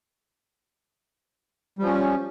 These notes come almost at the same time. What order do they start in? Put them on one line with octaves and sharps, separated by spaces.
G3 F3 C#4